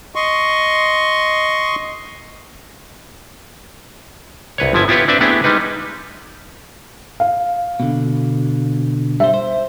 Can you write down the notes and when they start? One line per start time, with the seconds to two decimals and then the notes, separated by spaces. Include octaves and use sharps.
0.15 D#5 C6 C#6
4.58 C2 B4 C#5
4.73 G1 F3 E4 G#5
4.88 B3 E4 F4 G4 B4 C#5
5.08 C4 D4 B4 D5 E5
5.21 A3 B3 D4 E4 G4 G#4
5.44 G3 G#3 D#4 B4
7.20 F5
7.80 B2 D3
9.20 G3 C5 E5
9.34 C5